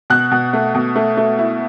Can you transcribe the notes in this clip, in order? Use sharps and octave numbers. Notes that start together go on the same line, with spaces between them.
B2 F#6
B2
A3
B2
A3
A3
E4